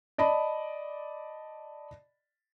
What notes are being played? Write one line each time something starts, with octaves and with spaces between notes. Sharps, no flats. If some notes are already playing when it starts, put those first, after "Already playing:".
D5 D#5 A5 B5